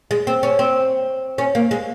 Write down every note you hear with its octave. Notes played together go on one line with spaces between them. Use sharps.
G#3
C4
C#4
C4
C#4
A#3
G#3